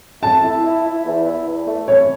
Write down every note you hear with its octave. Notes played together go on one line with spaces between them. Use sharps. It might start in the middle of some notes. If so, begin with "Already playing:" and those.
A3 A5
E4
E4
E4
E2
E4
E2
A3
E3 C#5